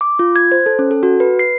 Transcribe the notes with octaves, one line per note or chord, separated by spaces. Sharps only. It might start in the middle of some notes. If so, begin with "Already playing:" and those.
D6
F4
G#6
C5
A4
C#4
A4
F#4
B4
C7